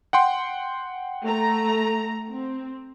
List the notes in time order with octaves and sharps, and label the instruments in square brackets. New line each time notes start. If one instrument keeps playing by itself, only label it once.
[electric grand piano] F#5 G5 C6
[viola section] A3 A#5
C4